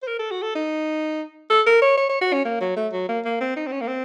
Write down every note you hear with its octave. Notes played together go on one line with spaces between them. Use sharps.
C5
A#4
A4
F#4
A4
D#4
A4
A#4
C#5
C#5
C#5
F#4
C#4
A#3
F#3
A3
F#3
A#3
A#3
C4
D#4
C4
C#4
A#3
C4